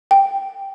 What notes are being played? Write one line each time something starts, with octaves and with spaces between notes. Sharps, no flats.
G5